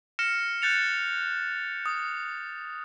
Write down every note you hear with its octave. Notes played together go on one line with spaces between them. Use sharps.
F6 A#6 C#7 E7
F#6 G6 A6 C#7 F7
D#6